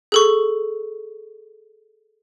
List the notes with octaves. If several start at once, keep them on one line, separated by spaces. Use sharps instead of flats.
G#4 A4 C#6